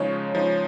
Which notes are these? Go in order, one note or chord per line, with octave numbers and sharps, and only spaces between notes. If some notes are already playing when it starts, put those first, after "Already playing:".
Already playing: C#3 F3 G#3 D#4 C#5
C#3 F3 G#3 D#4